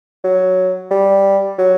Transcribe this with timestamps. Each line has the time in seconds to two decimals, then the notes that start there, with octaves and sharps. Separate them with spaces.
0.24 F#3
0.91 G3
1.58 F#3